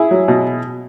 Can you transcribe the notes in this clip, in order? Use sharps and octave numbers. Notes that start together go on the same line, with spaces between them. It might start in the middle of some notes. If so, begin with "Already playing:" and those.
Already playing: E4 G#4
F#3
B2